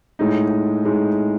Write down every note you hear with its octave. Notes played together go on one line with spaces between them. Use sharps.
A2 G#3 D#4
A2 G#3 D#4